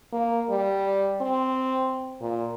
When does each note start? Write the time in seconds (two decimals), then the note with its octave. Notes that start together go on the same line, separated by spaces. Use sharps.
0.13 A#3
0.50 G3
1.21 C4
2.21 A#2